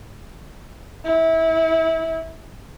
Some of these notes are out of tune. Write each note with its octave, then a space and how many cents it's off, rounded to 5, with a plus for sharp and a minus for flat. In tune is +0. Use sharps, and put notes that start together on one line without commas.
E4 -25